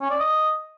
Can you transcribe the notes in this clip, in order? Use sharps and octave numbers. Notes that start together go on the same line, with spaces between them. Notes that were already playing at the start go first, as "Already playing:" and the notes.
C#4
D5
D#5